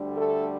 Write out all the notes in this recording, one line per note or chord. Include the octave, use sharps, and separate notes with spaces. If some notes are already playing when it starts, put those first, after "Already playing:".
Already playing: D2 D3 G3
A3 A4